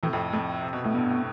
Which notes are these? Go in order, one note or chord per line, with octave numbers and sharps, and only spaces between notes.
A2 C3 E3
F2 A2
F2 A3
C3
B2
A2 A3
G2 B3
A2